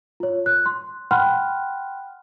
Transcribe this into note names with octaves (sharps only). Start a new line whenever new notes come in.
F4 C#5
F#6
C6
F#5 G5 B5 C6 F6 F#6